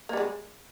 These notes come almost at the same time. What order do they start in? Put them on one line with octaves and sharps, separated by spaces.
A#3 G3 G#3